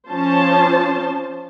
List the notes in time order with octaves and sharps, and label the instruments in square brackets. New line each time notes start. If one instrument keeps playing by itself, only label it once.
[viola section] F3 C#4 C5 A5